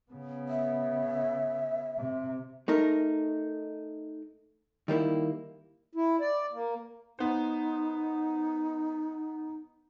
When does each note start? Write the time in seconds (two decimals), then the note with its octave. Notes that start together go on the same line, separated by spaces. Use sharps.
0.12 C#3 B3
0.49 E5
1.97 C3
2.68 A3 D#4 A#4
4.88 D#3 G3 A#3 E4
5.95 E4
6.21 D5
6.53 A#3
7.19 B3 D#4 C5